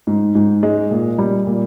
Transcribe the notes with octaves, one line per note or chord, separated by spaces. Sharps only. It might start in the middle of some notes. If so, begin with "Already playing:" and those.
G#2
G#2
G#3
A#2
G3
A#2